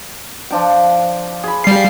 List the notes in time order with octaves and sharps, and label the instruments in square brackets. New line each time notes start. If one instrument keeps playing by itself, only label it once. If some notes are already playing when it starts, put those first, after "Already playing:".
[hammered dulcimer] F3 D4 G5
G#4 B5
[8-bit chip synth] G3 C7 [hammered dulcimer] F5